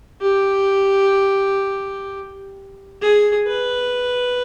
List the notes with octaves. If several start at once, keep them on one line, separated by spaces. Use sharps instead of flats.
G4
G#4
B4